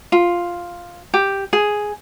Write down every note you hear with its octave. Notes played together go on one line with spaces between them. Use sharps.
F4
G4
G#4